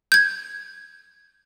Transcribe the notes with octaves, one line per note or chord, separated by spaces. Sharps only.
G6 G#6